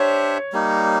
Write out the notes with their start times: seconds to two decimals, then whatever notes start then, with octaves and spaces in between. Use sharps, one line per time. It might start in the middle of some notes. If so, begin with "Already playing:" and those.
Already playing: D4 G4 C5 C#5 E5
0.53 G3 A#3 D#4